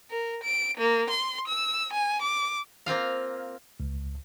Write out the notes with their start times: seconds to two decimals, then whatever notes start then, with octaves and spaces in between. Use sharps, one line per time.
0.11 A#4
0.44 D7
0.78 A#3
1.10 C6
1.48 E6
1.93 G#5
2.22 D6
2.86 A#3 C4 F4 F5
3.80 C#2